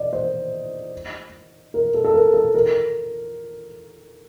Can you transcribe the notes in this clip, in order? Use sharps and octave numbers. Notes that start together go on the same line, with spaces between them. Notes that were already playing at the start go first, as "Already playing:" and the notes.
Already playing: D5 D#5
C5
A#4
A4
A4
A#4
A4
A#4